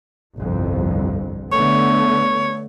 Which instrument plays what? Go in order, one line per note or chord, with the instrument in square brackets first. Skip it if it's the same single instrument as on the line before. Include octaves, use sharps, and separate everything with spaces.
[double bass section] G1 C2 F2
[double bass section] D3 A3 B3 [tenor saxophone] C#5